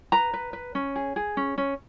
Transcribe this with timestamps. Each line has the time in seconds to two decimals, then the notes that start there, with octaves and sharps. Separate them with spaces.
0.12 B4 A#5
0.33 B4
0.53 B4
0.75 C#4
0.96 G#4
1.16 G#4
1.37 C#4
1.58 C#4